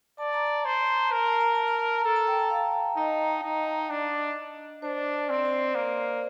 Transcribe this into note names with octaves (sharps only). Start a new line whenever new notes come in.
D5 A5
A#5
A5
A#5
C5
A5
A#5
A5
A#4 A#5
A5
A#5
A5
A#5
A5
A4 A#5
A5
G5
A5
F5
D#4 D#5
D#4
D4
D4 C5
D5
C4
C5
A#3